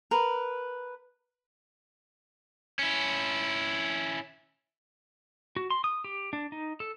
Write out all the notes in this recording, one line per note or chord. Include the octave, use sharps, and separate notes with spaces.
A#4 B4
C#4 E4
F#4
C6
D#6
G4
D4
D#4
A4